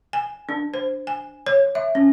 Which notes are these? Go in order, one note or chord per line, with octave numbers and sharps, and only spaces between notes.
G#5
D4
C5
G#5
C#5
E5
C#4